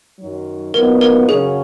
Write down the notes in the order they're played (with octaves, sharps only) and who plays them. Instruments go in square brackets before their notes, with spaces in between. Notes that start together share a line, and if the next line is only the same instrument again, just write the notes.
[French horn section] F#2 D#3 F#3
[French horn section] A#2 F#3 B3 D#4 [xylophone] A#4
[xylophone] A#4
[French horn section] F#2 C#3 F#3 C#4 [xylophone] G#4